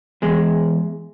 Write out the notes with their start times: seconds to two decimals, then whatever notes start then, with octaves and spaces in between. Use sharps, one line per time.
0.22 E2 G#3